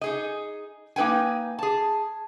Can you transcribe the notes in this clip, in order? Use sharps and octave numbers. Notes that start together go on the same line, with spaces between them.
D#4 G#4 D#5
A#3 D#4 B4 G5 G#5
G#4 A5